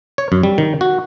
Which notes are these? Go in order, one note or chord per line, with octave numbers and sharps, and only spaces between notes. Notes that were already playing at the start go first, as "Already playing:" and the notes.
C#5
F#2
G3
D#3
F#4